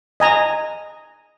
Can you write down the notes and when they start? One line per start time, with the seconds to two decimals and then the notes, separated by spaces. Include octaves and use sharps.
0.20 D#5 G#5 A#5